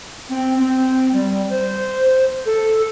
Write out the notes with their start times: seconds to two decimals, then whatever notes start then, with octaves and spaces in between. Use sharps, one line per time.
0.29 C4
0.58 C4
1.13 G3
1.50 C5
2.46 A4